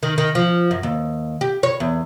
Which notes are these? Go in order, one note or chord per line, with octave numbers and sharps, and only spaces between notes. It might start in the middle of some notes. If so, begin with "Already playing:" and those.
D#3
D#3
F3
F#2
D#2
G4
C#5
E2